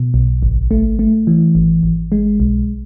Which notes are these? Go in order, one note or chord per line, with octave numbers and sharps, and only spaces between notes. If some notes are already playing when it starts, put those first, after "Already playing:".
Already playing: B2
B1
G#1
A3
A3
E3
G#1
G#1
G#3
B1